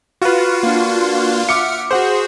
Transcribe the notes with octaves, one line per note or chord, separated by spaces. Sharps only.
F4 F#4 B4
A#3 D4
E5 F#5 D6 F6 C#7
F#4 G#4 C5 F#5